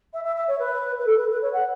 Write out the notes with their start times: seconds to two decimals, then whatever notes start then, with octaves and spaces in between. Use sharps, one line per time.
0.13 E5
0.23 E5
0.35 E5
0.47 C#5
0.59 B4
0.98 B4
1.06 A4
1.17 B4
1.29 B4
1.41 C#5
1.52 F#5